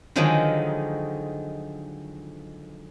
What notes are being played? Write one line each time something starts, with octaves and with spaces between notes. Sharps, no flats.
D3 D#3 F3 F#3 G#3 D#4